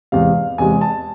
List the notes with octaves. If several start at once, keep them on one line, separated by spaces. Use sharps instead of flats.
E2 C3 G#3 F5
E2 C3 G#3 G#5
A5